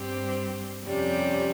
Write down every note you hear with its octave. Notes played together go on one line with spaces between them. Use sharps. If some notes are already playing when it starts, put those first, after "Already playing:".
Already playing: G2 G3 C4 G4 C5
F2 C3 G3 C#4